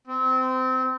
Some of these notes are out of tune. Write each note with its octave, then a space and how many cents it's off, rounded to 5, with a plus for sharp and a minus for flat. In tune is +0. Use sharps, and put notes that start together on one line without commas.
C4 -20